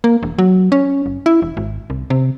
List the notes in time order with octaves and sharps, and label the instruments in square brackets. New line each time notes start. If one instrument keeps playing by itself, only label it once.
[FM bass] A#3
E1
F#3
C#4
F#1
E4
E1
G#1
C2
C3